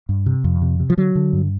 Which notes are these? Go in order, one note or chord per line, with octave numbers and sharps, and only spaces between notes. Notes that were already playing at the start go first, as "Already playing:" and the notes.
G2
C3
F2
C3
C3
F3
D3 F#3
D3
G2